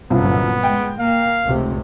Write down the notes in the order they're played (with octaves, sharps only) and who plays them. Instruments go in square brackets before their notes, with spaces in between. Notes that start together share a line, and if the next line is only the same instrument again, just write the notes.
[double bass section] G1 A#2 F#3 [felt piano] C2 F#2 F3 [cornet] B3
[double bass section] G#3 [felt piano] G5
[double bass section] A#3 [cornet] F5
[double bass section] F1 C#2 C3